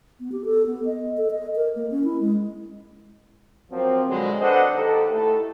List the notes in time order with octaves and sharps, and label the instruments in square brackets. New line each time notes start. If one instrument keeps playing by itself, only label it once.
[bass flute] B3
G4
A4
B3
D#5
A4
D#5
A#4
A#3
C#4
E4
G#3
[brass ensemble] F3 F#3 A#3 C4
B2 D3 F3 F#3 G#3
D4 A4 B4 C5 D#5 F#5
D#2 D#4 G4 A4
A3 E4 A4